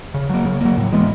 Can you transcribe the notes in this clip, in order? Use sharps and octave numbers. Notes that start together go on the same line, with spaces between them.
C#3
F#3 A#3
C#3
F#3 A#3
A2
E3 G#3 B3